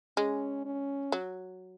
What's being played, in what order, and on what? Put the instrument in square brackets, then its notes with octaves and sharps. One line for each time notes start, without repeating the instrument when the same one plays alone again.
[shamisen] G#3 [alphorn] C#4
[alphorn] C#4
[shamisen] F#3